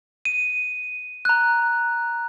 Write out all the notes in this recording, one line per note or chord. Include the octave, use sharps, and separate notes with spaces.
D#7
A#5 F#6